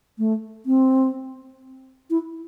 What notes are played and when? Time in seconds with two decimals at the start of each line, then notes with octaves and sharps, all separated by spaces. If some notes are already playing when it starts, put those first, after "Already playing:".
0.18 A3
0.66 C4
2.10 E4